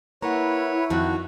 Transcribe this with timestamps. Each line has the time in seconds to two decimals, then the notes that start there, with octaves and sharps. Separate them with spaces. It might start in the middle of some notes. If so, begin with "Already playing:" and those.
0.22 A#3 E4 B4 C#5 F#5 A#5
0.90 F2 D#3 F3 F#4 F#6